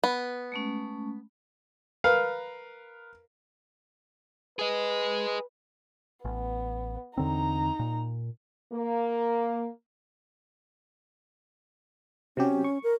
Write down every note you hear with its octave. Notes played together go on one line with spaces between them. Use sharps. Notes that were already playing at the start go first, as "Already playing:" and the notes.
B3
G#3 A3 C#4
A#4 B4 F5
G#4 B4 D#5
A1 B3
E2 D3 C4 D#4 A#5
A#2
A#3
C3 F#3 C#4 G4
C#6
A#4